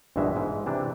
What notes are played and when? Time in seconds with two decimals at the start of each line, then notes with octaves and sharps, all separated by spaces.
0.16 A#1 G2 B2 E3 G#3 E5
0.36 G#2
0.66 C3 E3 D4